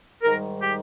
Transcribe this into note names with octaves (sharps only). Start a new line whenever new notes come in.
G#2 D#3 G3 A#4
G4